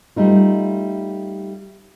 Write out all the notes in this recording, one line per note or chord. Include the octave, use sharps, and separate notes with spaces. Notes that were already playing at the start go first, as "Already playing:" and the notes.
G3 A3 D#4 F4